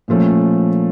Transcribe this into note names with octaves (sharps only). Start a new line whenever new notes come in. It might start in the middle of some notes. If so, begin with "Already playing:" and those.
A#2 F3 A3 C#4